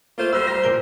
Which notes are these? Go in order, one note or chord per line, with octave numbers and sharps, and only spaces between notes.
A3 A#3 F4 C5
G3 C5 E6 F6
A#5 A#6
A#2 A#4 G7